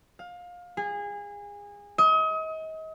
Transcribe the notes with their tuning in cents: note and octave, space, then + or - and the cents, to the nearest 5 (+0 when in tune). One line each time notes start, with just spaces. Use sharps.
F5 +25
G#4 -25
D#5 +35